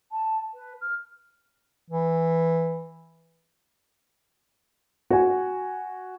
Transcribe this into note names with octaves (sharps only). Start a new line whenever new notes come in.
A5
B4
F6
E3
F#4 G#5